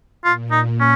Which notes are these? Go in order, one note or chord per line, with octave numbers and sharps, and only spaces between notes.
A#2 F4
D#4
C#4